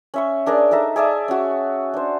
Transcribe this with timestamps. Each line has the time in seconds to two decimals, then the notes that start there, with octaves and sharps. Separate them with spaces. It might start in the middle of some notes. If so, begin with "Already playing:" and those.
0.14 C#4 E5 C#6
0.46 D4 G#4 A#4 D5
0.71 D#4 A4 E5 A#5
0.96 G#4 D5 E5 A5
1.28 C#4 F#4
1.94 D4 C5